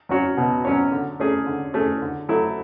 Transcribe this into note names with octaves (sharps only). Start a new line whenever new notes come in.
F#3 C#4 F#4 C#5
B2
F#3 C#4 F#4 C#5
D3
A3 C#4 G#4
D3
A3 C#4 G#4
D3
F#3 A3 E4 A4